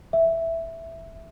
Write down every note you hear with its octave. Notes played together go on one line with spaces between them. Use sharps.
E5